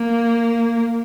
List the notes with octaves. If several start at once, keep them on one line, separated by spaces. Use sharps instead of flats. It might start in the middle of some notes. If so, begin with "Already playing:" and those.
Already playing: A#3